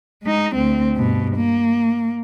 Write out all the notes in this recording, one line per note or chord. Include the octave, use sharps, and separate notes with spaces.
G#3 D#4
D2 C4
G2 B2
A#3